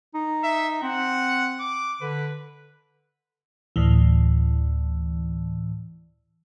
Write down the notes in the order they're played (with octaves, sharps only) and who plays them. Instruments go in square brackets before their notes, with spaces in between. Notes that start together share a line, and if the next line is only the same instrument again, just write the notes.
[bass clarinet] D#4
[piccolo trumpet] E5
[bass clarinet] C4 [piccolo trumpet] F#5
[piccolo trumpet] D6
[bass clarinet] D3 [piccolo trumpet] B4
[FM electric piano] D2 A2 E3